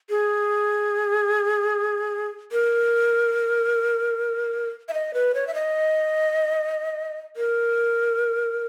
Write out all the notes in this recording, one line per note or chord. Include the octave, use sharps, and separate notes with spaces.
G#4
A#4
E5
D#5
B4
C#5
E5
D#5
A#4